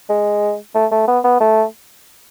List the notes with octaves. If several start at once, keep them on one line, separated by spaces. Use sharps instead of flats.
G#3
A3
A3
B3
B3
A3